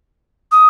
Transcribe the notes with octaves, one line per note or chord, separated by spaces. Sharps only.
D#6